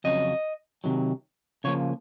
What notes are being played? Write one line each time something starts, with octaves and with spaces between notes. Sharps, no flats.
F2 C#3 F#3 C#4 D#5
C3 D#3 F#3
C#3 F3 A#3 C#5